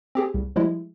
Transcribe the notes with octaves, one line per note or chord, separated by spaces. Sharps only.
C4 G4 G#4
C2
F3 G3 G#3 E4